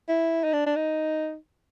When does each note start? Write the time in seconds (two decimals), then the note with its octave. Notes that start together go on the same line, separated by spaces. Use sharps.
0.09 E4
0.44 D#4
0.53 D4
0.66 D4
0.76 D#4